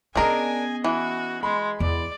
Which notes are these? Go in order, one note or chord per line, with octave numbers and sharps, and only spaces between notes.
B3 C#4 D4 G#4 A#4 D#5 G#5
E3 F#4
G#3 B5 C6
E2 D5